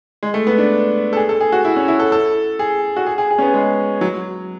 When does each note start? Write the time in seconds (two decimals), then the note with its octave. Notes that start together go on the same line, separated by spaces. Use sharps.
0.23 G#3
0.34 A3
0.47 B3
0.58 D4
1.13 A4
1.16 G#4
1.29 A4
1.41 G#4
1.52 F#4
1.65 E4
1.76 C#4
1.88 E4
2.00 A4
2.12 A4
2.59 G#4
2.96 F#4
3.06 G#4
3.18 G#4
3.31 G#4
3.38 C#4
3.42 B3
3.54 G#3
4.01 F#3